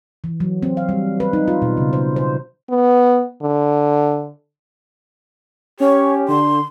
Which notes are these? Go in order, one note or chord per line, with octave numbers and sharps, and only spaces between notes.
E3
F#3
C4
F5
G3
B4
D#4
F4
B2
C#3
C5
C5
B3
D3
C#4 G4 C#5
D3 C6